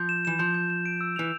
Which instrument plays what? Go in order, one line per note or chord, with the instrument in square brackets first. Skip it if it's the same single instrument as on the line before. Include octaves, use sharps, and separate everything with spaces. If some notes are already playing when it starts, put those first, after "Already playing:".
Already playing: [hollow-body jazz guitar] F3 [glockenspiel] G6
[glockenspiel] E7
[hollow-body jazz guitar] E3 [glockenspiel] E7
[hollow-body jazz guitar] F3 [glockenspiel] G6
[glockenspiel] G6
E7
D7
E6
[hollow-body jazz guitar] E3 [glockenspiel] F7